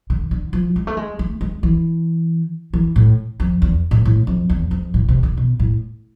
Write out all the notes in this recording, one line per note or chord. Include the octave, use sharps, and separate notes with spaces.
D3
D3
F3
G#3
A3
G#3
A3
G#3
E3
E3
A2
F2
E2
A2
A2
F2
E2
F2
A2
C3
D3
B2
A2